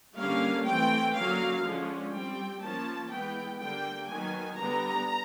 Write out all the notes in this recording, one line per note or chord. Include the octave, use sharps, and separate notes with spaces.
D3 G3 A#3 C#4 F5
E3 A3 C4 G5
D3 F#3 A#3 C#4 F5
D3 F3 G#3 C#4
G3 C4 G5
F3 A#3 C#4 A5
E3 G#3 B3 G5
D3 G3 A#3 G5
D#3 F#3 B3 G#5
D3 G3 B3 A#5